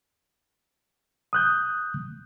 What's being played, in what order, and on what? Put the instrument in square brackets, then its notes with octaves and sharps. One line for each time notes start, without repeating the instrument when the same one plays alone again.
[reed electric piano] D#6 F#6 G6